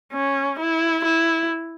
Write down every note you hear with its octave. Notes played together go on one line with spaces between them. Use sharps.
C#4
E4
E4